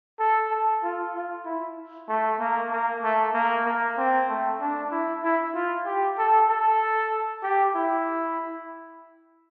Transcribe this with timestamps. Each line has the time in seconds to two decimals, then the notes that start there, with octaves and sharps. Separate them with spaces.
0.20 A4
0.51 A4
0.83 F4
1.14 F4
1.45 E4
2.09 A3
2.40 A#3
2.71 A#3
3.03 A3
3.34 A#3
3.66 A#3
3.98 C4
4.29 A3
4.60 D4
4.91 E4
5.23 E4
5.54 F4
5.86 G4
6.18 A4
6.49 A4
7.43 G4
7.75 E4